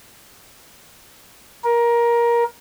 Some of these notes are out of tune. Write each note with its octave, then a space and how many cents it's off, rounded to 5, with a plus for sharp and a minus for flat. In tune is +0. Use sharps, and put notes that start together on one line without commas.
A#4 +20